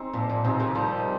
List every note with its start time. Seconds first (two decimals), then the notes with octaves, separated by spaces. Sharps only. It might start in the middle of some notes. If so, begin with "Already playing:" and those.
Already playing: C4 D#4 G#4
0.13 A#2 F3
0.29 A#2
0.44 C3 C4 D#4 G#4
0.60 C3 D#3
0.75 D#3 F3 G3